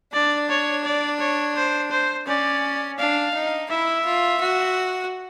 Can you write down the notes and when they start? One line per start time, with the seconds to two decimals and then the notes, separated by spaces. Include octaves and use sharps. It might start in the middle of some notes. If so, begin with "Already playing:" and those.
0.13 D4 D5
0.50 C#5
0.84 D5
1.20 C#5
1.56 C5
1.91 C5
2.27 C#4 D5
2.98 D4 F5
3.34 D#4
3.70 E4 E5
4.05 F4
4.41 F#4